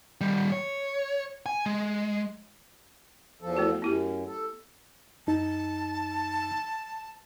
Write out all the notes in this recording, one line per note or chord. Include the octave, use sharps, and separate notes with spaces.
D#3 G3
C#5
G#5
G#3
E2 F3 A4
A3 E4 F#4
F#2 B3 E4 G4
A4
F#2 D#4 A5